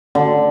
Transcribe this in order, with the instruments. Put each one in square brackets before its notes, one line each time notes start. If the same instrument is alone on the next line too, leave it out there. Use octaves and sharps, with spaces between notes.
[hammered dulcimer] D3